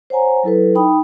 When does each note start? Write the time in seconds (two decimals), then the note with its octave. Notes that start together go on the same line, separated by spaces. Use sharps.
0.10 C5 C#5 F#5 G#5 A#5
0.43 F#3 E4 A4 B4
0.75 D#4 G5 B5 D#6